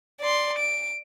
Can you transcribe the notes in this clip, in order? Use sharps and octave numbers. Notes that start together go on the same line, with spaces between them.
D5 C6
D7